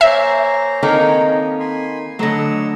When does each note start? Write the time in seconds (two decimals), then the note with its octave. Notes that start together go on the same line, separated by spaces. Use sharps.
0.01 A#3 C5 C#5 E5 G#5 A#5
0.83 D#3 A#3 C4 D#4 A4 C#5 G5 G#5
1.25 C#4 D#5
1.59 G#5 B5 C6
2.19 D3 F#3 A3 A4 C#5 D#5 E6 A#6